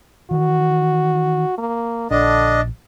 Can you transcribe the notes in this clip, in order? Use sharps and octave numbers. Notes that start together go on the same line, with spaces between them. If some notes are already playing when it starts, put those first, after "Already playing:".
D#3 E3 F#4
A#3
A#1 D3 D4 D#5